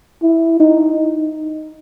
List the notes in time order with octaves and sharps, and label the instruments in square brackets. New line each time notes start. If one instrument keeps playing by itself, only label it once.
[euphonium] E4
D#4